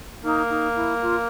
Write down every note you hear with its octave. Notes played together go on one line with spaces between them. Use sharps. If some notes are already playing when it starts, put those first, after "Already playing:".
A#3 D#4
D#4
E4
F4